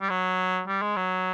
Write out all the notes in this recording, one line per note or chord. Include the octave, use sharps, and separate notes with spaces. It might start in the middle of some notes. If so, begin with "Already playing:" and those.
G3
F#3
G3
G#3
F#3